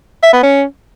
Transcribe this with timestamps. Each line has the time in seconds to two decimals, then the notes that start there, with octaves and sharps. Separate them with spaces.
0.23 E5
0.33 B3
0.44 C#4